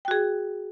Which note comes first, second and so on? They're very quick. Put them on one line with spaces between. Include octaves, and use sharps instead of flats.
G5 F#4 G#4